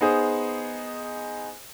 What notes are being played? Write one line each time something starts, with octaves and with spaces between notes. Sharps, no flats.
B3 D#4 G#4 C5